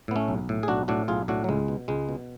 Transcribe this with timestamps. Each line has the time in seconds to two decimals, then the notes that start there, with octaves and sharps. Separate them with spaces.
0.08 A2 B3
0.16 A3 C#4
0.28 B1
0.49 A2
0.63 G#4
0.68 B1 D4 F#4
0.88 A2 D4 F#4
1.08 B1 F4 G#4
1.28 A2 D4 F#4
1.44 F#3
1.49 C#2 G#3
1.68 B2
1.88 C#2 G#3
2.09 B2